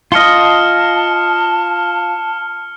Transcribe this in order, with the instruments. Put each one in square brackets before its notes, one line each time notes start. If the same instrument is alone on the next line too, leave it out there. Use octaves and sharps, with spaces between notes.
[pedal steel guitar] F4 D#5 [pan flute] A5 [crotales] F6 C#7 G7